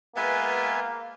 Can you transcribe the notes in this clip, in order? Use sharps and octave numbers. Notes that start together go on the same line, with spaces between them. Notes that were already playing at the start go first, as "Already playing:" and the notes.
G#3 A#3 B3 F4 B4 E5 G#5